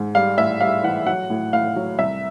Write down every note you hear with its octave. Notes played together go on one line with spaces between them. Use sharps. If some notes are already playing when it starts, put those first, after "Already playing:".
Already playing: G#2
G3 F5
A2 E5
G3 F5
E3 F#5
F#3 F#5
A2
A2 F5
F#3
C2 E5